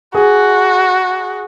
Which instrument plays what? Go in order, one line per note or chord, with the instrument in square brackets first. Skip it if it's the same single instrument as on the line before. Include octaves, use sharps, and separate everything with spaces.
[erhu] F#4 [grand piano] G#4